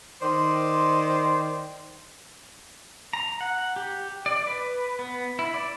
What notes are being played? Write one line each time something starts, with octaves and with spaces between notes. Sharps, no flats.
D#3 C5 D5 C6
A#5
F#5
G4
D5
B4
B3
E4
D5